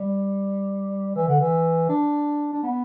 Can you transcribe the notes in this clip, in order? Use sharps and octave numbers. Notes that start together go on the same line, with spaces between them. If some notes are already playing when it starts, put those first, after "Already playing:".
Already playing: G3
E3
D3
E3
D4
D4
B3